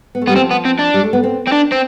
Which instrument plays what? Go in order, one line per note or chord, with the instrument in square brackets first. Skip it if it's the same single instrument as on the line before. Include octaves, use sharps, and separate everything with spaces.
[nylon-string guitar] B3
A3
[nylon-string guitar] G3 [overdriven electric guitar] B3
[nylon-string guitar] F3 [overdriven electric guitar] C4
[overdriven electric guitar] B3
C4
D4
[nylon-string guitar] G3
A3
B3
C4
[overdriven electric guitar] C4
D4
C4